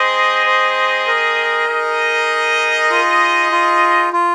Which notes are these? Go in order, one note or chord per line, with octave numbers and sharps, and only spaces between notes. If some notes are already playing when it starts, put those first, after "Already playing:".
Already playing: C4 G#4 C5 D#5
C5
A#4
D#4 G#4 D#5
F4
F4
F4